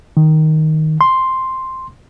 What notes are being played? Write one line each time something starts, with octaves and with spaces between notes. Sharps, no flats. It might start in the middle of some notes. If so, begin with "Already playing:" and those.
D#3
C6